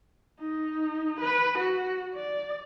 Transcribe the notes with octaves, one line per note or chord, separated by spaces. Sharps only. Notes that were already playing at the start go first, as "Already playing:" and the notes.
D#4
B4
F#4
D5